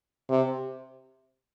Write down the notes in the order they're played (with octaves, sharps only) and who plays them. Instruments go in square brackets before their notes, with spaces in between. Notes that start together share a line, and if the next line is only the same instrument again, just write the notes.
[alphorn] C3